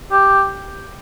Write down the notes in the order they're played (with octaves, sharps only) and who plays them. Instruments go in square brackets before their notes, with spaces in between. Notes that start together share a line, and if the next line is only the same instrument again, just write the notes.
[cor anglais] G4